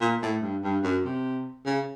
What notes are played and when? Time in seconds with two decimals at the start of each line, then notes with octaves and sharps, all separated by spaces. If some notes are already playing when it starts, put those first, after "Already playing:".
0.01 A#2
0.22 A2
0.42 G2
0.64 G2
0.83 F#2
1.05 C3
1.65 C#3